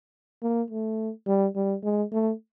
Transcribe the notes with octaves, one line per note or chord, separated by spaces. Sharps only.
A#3
A3
G3
G3
G#3
A3